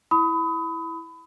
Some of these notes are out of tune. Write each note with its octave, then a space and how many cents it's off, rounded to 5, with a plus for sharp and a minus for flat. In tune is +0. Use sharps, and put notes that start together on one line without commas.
E4 +0 B5 +25 D#6 +25